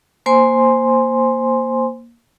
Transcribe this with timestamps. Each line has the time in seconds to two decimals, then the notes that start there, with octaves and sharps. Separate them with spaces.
0.26 A#3 C5 G#5 C6